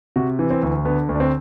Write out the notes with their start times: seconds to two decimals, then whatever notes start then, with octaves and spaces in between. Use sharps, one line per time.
0.16 C3 F#4
0.39 E3
0.51 C4
0.63 D2
0.85 D3 B3
1.09 D2
1.15 D4
1.20 C4